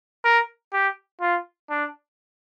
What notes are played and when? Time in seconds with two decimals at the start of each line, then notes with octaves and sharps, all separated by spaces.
0.25 A#4
0.73 G4
1.21 F4
1.70 D4